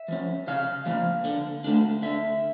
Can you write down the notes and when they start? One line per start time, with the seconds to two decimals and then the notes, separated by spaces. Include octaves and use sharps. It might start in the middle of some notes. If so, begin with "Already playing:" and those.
Already playing: E5
0.08 F3 C#4
0.48 C#3 F5
0.86 F3 A#3
1.25 D3
1.64 A3 D4
2.02 D3 E5